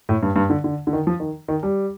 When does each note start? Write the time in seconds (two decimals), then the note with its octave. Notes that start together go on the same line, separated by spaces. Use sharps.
0.09 A2
0.23 G2
0.36 G2
0.50 D3
0.64 D3
0.87 D3
0.93 D#3
1.07 F3
1.20 D#3
1.48 D#3
1.63 G3